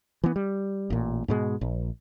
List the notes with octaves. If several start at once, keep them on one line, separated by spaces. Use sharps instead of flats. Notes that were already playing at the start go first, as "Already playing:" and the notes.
E3 B3
G3
A1 A#2
G#2 B2 G#3
A#1